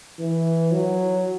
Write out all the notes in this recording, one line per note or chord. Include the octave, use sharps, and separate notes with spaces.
E3
F#3